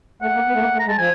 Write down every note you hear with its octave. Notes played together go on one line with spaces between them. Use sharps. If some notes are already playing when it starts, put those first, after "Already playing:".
A3 F#5
A#3
B3
A3
A#3
A3
A#5
G#3
A5
F3 G#5